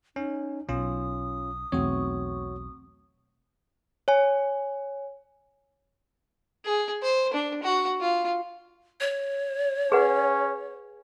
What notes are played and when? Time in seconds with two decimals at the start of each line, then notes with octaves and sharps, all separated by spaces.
0.16 C#4 D#4
0.69 B1 C#4 F4 D#6
1.72 B1 E2 A3 C4 F#4 C#5 C#6
4.08 C#5 G#5
6.65 G#4
7.02 C5
7.33 D4
7.63 F#4
8.01 F4
9.01 C#5
9.92 C#4 G#4 B4 F#5